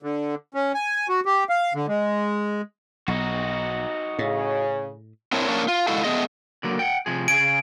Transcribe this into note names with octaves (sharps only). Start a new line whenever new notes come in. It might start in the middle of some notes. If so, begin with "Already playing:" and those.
D3
C#4
G#5
F#4
G4
F5
D3
G#3
B1 D#4 F#4
A2 C#3
C4 D4 E4 A#4 C#5
A#3 C#4 D4
F4
G#3 E4 F#4 A4 F5
A3 B3 G#4 D#5
D3 F#3 A#3
F#5 G5
C3 F3 G#4
C#3 G#4 G#5 D7